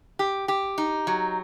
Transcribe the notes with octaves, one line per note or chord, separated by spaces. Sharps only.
G4
G4
D#4
F#3